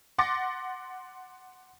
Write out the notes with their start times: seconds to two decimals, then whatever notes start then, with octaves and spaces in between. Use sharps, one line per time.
0.18 F#5 C6 D6 A6 A#6 C#7